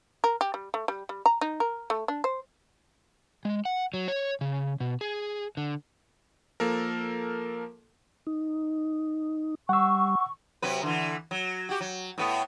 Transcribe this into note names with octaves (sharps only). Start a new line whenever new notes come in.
A#4
G4
G3
A3
G3
G3
A#5
D#4
A#4
A3
D4
C5
G#3
F#5
F#3
C#5
C#3
B2
G#4
D3
F3 A#3 A4 A#4
D#4
G3 F#5 C#6 E6
C3 F#3 B4
D3 E3
F#3
F#4 G4
F#3
A2 B3